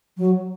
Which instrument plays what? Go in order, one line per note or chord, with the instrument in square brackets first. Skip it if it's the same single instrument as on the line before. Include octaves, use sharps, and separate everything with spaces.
[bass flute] F#3